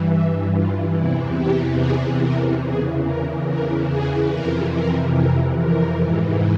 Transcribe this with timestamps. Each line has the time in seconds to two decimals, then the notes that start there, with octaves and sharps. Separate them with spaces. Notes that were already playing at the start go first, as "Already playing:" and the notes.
Already playing: G2 E3
0.10 E4
0.53 F4
0.95 E2 C3 E3 E4
1.37 G4
1.79 G#4
2.21 A#4
2.63 E2 C#3 E3 G#4
3.05 A#4
3.48 A#4
3.90 G#4
4.32 F2 C3 E3 A#4
4.74 A#4
5.16 A#4
5.59 A#4
6.00 G#2 E3